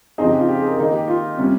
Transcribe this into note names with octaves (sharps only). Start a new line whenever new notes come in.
C#3 F3 C4 D#4 G#4
G4
F4
G4
G#4
A#4
D#3 A#3 D#4 G#4
G4
F4
C3 G3 C#4